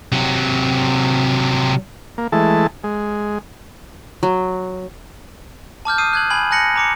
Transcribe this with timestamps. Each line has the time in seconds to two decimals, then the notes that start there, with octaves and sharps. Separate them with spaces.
0.12 C3 F#3
2.18 A#3
2.32 E3 G#3 A3 A5
2.84 G#3
4.23 F#3
5.85 A5 D6 F6 G6
5.98 D#6 C7 D#7
6.13 F#6 G#6 F#7
6.30 G#5 B5 G#6 F#7
6.51 G#5 A5 F#6 A#6 C#7 F#7
6.76 A#5 D6 C#7